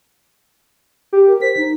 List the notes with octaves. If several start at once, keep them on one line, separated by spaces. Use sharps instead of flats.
G4
A#4
C5 B6
D#4